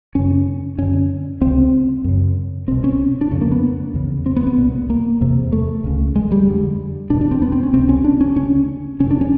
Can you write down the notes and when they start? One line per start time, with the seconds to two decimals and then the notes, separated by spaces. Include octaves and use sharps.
0.15 F#2 C#3 C#4
0.78 F#2 D3 C#4
1.41 C#2 C3 C4
2.04 F#2 C#3
2.68 C2 B2 C4
2.84 C#4
3.21 D4
3.31 F2 C#3 C#4
3.41 A#3
3.52 B3
3.94 E2 C#3
4.26 C4
4.36 B3
4.47 B3
4.58 C2 A#2
4.90 A#3
5.21 E2 C3
5.52 A3
5.84 C#2 C#3
6.16 G#3
6.32 G3
6.47 F2 D3
7.10 E2 B2 D4
7.21 D4
7.31 C4
7.42 B3
7.52 C4
7.63 C#4
7.74 C#2 C3 C4
7.89 C#4
8.04 D4
8.21 C#4
8.36 C#3 C#4
8.41 D2
9.00 F2 C3 C#4
9.11 D4
9.21 C#4